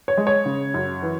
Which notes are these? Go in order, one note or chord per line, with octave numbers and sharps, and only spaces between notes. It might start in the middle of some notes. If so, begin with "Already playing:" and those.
C#5
G#3
C#5
C#3
F#2
E3